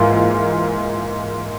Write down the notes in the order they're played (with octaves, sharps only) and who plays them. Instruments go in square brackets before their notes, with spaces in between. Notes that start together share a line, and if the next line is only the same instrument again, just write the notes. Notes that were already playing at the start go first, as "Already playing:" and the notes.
Already playing: [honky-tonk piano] G#2 E3 A#3 F4